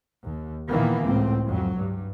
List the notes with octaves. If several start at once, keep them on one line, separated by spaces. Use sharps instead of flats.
D#2
A#2 D#3 E3 A#3 B3
C#2 A2 C4
F2 F#3
G2